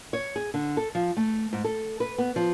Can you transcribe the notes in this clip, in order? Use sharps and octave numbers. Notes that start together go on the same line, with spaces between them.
C#5
G#4
D3
A4
F3
A3
G#2
A4
B4
B3
F3